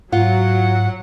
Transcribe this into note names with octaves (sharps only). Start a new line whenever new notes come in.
G#2 F#3 F4 F#5